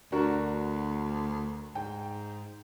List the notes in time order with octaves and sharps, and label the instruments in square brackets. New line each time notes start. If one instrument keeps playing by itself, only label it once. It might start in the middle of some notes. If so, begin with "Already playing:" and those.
[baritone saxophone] D2 [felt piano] D4 F#4 A#4
[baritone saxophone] G#2 [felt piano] G5